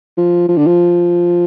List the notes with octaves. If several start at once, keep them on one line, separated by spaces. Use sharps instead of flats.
F3
F3
D3
F3